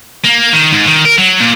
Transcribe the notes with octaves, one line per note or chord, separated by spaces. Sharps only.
A#3
D#3
G#2
D#3
A#4
F#3
A#2